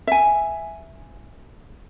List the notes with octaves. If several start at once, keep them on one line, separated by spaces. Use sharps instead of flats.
E5 G#5